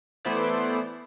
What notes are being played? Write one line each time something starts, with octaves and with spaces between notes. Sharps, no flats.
E3 A3 B3 E4 C5 D5